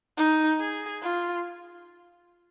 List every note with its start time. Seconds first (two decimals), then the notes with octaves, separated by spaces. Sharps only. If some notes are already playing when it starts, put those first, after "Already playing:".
0.17 D#4
0.60 G#4
1.03 F4